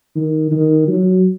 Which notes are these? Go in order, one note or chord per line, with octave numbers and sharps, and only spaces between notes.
D#3
D#3
F#3